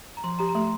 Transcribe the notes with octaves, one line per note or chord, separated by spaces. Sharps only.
A#5
F3 C6
G4 A#5
A#5
A3 C6